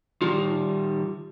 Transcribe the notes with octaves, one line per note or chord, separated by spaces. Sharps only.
D#3 G3 F4